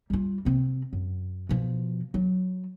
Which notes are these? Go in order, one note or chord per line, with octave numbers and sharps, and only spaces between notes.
G3 F4
C3 C4
F#2
B2 F3
F#3